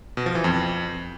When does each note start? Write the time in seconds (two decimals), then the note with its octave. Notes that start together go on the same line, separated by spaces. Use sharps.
0.17 B2
0.26 F3
0.35 E3
0.44 F2